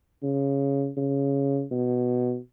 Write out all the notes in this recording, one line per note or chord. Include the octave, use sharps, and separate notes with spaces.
C#3
C#3
B2